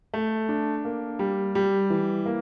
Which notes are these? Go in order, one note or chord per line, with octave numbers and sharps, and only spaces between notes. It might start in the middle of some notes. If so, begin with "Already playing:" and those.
A3
D4
A#3
G3
G3
E3
A#3